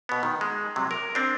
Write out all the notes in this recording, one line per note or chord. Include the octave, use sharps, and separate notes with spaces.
B2 B3
D#3
G#3
C3 F#3
A#4
C4 D4